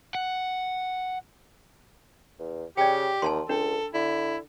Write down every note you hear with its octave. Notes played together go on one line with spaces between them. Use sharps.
F#5
E2
C#3 G4 D5 G5
D#2 G#5 A5 C6
C#2 D4 A4
D3 E4